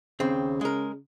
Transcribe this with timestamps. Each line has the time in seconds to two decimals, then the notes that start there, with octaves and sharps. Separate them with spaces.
0.20 D#2 C#3 C4
0.61 G#3 A#4